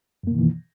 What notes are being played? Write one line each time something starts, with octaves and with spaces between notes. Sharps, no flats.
F#2 B2 D#3 E3 A#3